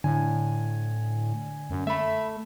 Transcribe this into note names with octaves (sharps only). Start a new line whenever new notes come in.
A2 D3 G#5
F#2
A3 E5 B5